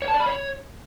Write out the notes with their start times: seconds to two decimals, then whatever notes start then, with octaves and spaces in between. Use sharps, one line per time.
0.02 C#5
0.08 A5
0.14 D5
0.20 B5
0.26 C#5